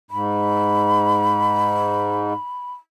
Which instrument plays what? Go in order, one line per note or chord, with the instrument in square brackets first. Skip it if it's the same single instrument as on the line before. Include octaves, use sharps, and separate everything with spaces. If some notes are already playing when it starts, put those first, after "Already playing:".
[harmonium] G#2 [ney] B5